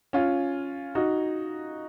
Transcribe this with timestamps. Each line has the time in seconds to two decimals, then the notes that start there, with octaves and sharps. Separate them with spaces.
0.13 C#4 F4
0.95 D#4 F#4